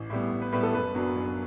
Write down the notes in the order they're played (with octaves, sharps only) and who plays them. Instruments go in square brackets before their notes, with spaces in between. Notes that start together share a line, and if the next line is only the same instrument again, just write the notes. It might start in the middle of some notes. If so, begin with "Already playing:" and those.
Already playing: [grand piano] A1
A2 G3 B3
A1
B4
A2 G3 B3 B4
A4
F#1 B4
F#2 F#3 B3 D4
F#1